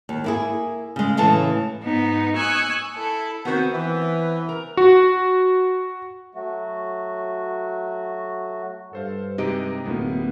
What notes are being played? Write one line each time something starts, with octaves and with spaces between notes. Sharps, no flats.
D#2
A#3 E4 G#4
C#3 G#3
A2 C#3 E3 A4 A5
G#2 B3 D#4
G#5 C#6 D#6 E6 F#6
E4 A4
D#3 B3 C4 F#4
E3
A#4
F#4
F#3 A3 F#4
G2 A4 C5 F5
C3 G#3 D#4 G4 D#5 G5
D1 A2 A#3 B3